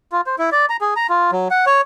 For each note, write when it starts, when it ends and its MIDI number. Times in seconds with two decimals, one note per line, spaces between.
0.12 0.21 65
0.26 0.36 72
0.38 0.50 64
0.52 0.66 74
0.69 0.77 82
0.81 0.94 68
0.96 1.07 82
1.10 1.31 65
1.32 1.48 54
1.50 1.65 78
1.66 1.81 73